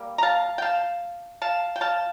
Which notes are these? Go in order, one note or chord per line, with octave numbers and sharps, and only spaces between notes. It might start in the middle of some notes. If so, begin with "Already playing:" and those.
Already playing: G3 A#3
A#5
F5 A5
G5
F5 A5
F5 A5
G5
F5 A5